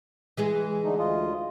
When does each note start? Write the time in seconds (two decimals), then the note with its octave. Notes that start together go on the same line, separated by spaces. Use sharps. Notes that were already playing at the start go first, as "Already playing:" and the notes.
0.37 E3 G#3 G#4
0.84 D3 A3 D#4
0.99 D2 F4 D#5